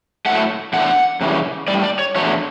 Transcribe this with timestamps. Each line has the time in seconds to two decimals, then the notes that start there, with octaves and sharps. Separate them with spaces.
0.26 A2 F#3 A3 F#5
0.73 E2 D3 A3 F#5
1.21 F#2 C#3 E3 G3
1.68 A2 G3 D5
1.83 D5
1.99 C#5
2.16 E2 D3 F#3 A3 C#5